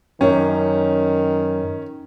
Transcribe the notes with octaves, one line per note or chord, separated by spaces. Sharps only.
F#2 D#3 C#4